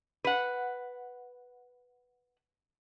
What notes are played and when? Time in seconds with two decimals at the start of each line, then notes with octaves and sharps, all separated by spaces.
0.24 B4 F#5